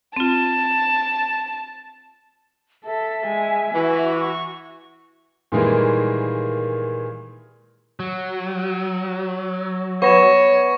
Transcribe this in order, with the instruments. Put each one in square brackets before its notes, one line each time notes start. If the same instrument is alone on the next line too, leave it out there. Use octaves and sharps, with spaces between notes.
[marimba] C4 F4 [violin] A5
[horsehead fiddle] A4 [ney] E5
[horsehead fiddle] G#3 G#5
[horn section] E3 [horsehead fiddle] F#4
[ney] C#6
[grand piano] A#2 D#3 E3 G3 G#3 A#3
[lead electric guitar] F#3
[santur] B3 [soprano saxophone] C#5 [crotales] C#6 A#6 E7